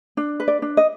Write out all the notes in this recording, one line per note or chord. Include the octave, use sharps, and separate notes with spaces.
D4
B4
D5
D4
D#5